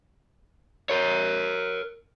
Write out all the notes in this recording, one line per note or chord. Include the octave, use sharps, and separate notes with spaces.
A#4 C#5